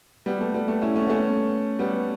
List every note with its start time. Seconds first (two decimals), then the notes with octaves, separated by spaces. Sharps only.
0.26 G3 B3
0.41 A3
0.54 G3 B3
0.68 A3
0.81 C#4 E4
0.95 A3 C#4
1.06 B3
1.09 A3 C#4
1.79 G3 B3